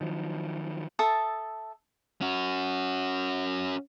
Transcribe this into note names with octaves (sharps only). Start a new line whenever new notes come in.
D#3 F3 F#3
A4 E5 A5 D#6
C#4 F#4